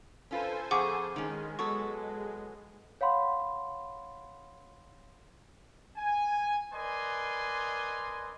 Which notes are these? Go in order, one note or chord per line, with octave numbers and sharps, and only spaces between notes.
C#4 F4 A4 B4 C5 G#5
F2 G#4 F#5 C#6 D6
D#3 G#3 C#4
F#3 B3 A4 C#6
C#5 F5 F#5 B5 C6
G#5
A#4 B4 D5 D#5 G#5 C6